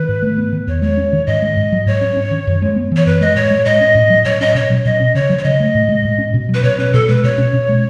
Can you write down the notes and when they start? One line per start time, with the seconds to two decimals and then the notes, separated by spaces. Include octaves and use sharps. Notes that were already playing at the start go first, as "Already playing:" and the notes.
Already playing: D#3 B4
0.08 G#2
0.22 A3
0.38 B3
0.52 D#3
0.67 E2 C#5
0.82 G#3 C#5
0.97 C#4
1.13 D#3
1.27 G#2 D#5
1.42 G#3
1.57 G#2
1.72 F#3
1.86 G#2 C#5
2.01 C#4
2.17 C#4
2.31 D#3
2.47 F#2
2.62 G#3
2.76 B3
2.92 E3 C#5
3.06 F#2 B4
3.21 G#3 D#5
3.36 A2 C#5
3.51 G#3
3.65 A2 D#5
3.81 C#4
3.95 A2
4.10 F#3
4.25 A2 C#5
4.41 C#4 D#5
4.55 B2 C#5
4.70 F#3
4.85 B2 D#5
5.00 C#4
5.15 C#3 C#5
5.30 F#3
5.38 C#5
5.44 C#3 D#5
5.60 A3
5.75 A2
5.89 G#3
6.05 A2
6.19 C#4
6.34 B2
6.49 F#3
6.54 B4
6.63 B2 C#5
6.78 C#4 B4
6.93 B2 A4
7.08 G#3 B4
7.24 B2 C#5
7.38 C#4
7.53 B2
7.69 G#3